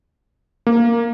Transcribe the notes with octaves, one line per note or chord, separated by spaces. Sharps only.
A#3